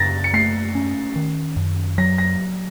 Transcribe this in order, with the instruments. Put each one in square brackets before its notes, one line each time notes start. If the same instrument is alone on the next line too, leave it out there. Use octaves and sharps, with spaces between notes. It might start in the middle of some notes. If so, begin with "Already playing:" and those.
Already playing: [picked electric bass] F#2 C#3 [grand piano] A6 A#6
[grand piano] C#7
[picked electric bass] A3 [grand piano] C7
[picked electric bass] C#4
D#3
F#2
[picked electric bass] F#3 [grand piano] A#6
[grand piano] A#6